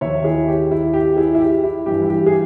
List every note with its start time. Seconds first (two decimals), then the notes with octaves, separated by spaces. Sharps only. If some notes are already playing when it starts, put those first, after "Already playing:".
0.01 D#2 D#3 C#5 E5
0.24 E4 G#4
0.48 G4
0.71 E4
0.93 G4
1.17 E4 G#4
1.35 E4
1.40 G4
1.63 E4
1.86 G2 E3 G4
2.02 E4
2.09 G4
2.26 G#4